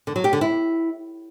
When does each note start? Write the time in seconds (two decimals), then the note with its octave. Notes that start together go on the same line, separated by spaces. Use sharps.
0.07 D3
0.16 F#3
0.24 G4
0.33 D3
0.41 E4